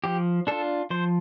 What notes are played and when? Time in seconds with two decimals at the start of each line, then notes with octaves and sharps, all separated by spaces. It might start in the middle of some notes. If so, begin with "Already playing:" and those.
0.04 F3 G4
0.47 D4 F4 A4
0.90 F3 C5